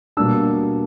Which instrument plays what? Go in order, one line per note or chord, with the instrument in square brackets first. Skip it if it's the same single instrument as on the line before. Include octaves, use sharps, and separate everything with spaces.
[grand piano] B2 G3 A#3 D4 E6